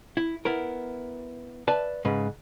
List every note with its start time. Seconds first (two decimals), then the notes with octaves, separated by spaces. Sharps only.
0.17 E4
0.45 B3 E4 A#4
1.68 B4 D5 E5 A5
2.05 G#2 C#3 B4